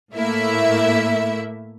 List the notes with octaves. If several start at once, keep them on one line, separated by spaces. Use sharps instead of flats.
A2 A3 A#3 E4 E5